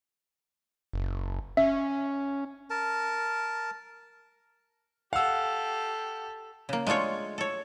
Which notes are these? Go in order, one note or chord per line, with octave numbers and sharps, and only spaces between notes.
F#1
C#4 E5
A#4 A5
G4 A4 F5 F#5 E6
C#3 A#3
G#3 A3 D4 F4 C#5
A4 C#5